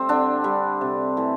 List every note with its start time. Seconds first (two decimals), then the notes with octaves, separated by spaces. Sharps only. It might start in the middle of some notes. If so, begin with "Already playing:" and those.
Already playing: G3 A3 C4
0.09 D3 D4
0.44 G3
0.81 C3
1.17 E3 A3